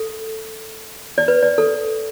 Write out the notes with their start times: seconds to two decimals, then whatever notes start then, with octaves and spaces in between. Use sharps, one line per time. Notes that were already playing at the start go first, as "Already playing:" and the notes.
Already playing: A4
1.18 D5
1.28 B4
1.43 D5
1.58 A4